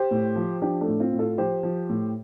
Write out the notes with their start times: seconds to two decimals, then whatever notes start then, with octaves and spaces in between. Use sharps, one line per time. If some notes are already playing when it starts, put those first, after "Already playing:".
Already playing: G4 C5
0.11 A2
0.36 F3
0.62 F3 D4 G4
0.81 A3 D4
0.87 A2
1.00 C4 F4
1.13 A2
1.19 F4 A4
1.38 F3 G4 C5
1.63 F3
1.89 A2